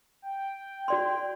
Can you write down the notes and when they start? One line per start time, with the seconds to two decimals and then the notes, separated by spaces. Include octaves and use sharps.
0.22 G5
0.88 F#4 D5 C6